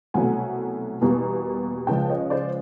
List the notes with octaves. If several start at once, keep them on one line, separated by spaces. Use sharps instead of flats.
C2 B2 F#3 A3 F#5 G#5
E2 B2 G3 A#3
C#2 C#3 F3 G#3 G5 A5
C#5 D#5
C5 D5